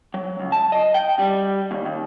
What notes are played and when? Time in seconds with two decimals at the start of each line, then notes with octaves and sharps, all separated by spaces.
0.14 F#3
0.40 C#2
0.52 A5
0.72 D#5
0.94 G5
1.19 G3
1.71 D#2
1.85 D#2